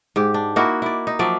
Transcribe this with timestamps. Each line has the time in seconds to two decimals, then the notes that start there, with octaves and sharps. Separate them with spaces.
0.16 G#2 G4
0.34 D4
0.56 A#3 D#4 E4 F#4
0.82 E4 D5
1.07 D#4
1.19 F3 F#3 D5 E5